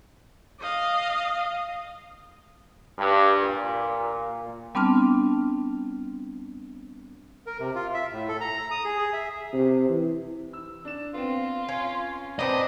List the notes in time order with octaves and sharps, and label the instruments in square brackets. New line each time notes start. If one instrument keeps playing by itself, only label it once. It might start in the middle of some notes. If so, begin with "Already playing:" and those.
[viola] D#5 F5
[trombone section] G2
A#2
[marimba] G3 B3 C4 D4 A5 F6
[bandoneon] A#4
C3
F4
E5
A2
A4
A#5
D#6
G#4
G#4
E5
[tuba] C3
E3
[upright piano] E6
D4 E7
[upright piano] B3 C4 [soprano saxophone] F4
[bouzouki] C#4
[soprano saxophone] C4 [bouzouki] D4 D#4 B4 [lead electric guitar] D#5 [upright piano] A5 A#5